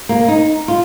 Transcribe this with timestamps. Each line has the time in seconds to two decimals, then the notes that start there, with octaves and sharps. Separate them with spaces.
0.09 A#3
0.28 D#4
0.68 F4